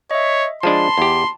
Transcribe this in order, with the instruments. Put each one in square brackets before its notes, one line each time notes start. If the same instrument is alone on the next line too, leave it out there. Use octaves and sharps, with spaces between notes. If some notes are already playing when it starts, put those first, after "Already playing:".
[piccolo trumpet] C#5 [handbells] D#5 E5
[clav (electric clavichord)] F3 G#3 D4 [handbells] A5 B5 [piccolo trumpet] C6
[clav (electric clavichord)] E2 G4